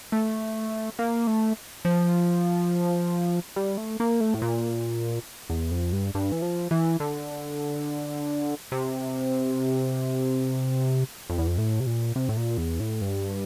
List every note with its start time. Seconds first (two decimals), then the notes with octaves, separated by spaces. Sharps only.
0.12 A3
0.99 A#3
1.27 A3
1.85 F3
3.56 G3
3.78 A3
4.00 A#3
4.20 A3
4.34 A2
4.42 A#2
5.50 E2
5.71 F2
5.92 G2
6.15 G2
6.32 E3
6.42 F3
6.71 E3
7.00 D3
8.72 C3
11.30 F2
11.38 E2
11.47 F2
11.58 A2
11.80 C3
11.87 A#2
12.16 C3
12.29 A2
12.37 A#2
12.58 E2
12.80 A2
13.01 G2